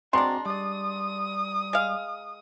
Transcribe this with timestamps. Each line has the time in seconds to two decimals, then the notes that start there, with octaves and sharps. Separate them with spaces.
0.13 G#3 C4 D4 F#4 D5 A#5 C6
0.46 G3 D5 D#6
1.73 G#3 F5